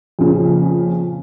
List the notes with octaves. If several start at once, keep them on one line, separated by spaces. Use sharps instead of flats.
F2 A#2 C#3